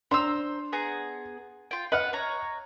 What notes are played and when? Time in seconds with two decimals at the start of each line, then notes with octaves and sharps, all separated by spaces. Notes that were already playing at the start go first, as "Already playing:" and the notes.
0.11 D4 C5 A#5 C6 E6
0.72 B3 G#4 A#5
1.71 F4 G5
1.92 B4 D#5 F#5 F6
2.13 C#5 A#5